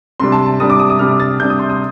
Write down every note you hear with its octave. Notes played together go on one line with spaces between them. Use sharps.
C3 G3 D4 C6
A5
A5
C3 G3 D4 D#6
D6
D#6
D#6
C3 G3 D4 F6
A6
C3 G3 D4 G6
D#6
C6
D#6